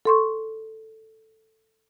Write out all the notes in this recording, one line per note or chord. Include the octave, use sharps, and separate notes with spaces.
A4 C6 C#6